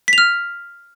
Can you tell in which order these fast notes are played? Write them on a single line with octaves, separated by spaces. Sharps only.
B6 F7 F6